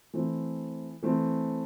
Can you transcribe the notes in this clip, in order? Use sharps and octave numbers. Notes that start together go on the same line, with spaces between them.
E3 A3 C4
E3 A3 C4